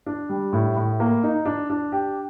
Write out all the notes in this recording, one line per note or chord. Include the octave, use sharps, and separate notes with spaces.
D4
G3
A2
A2
A#3
D#4
D4
D4
G4